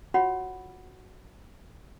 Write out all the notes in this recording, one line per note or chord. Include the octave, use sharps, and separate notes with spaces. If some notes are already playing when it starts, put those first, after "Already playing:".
F4 F#4 C#5 F#5 B5